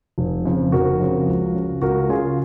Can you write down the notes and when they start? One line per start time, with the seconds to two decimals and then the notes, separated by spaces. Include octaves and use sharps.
0.18 F1
0.46 F2 C#3
0.72 F1 F#4 A#4
1.00 F2 C#3
1.27 C#2
1.55 C#3
1.82 C#2 F#4 A#4
2.09 C#3 F4 G#4